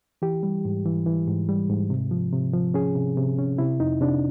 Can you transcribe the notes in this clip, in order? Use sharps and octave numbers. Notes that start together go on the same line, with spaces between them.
E3 G4
G3
G#2
E3
E3
G#2
G3
G#2
C3
F3
C3
F3
C#4 G#4
C3
C3
C#4
C3 E4
F2 D#4
C3 D4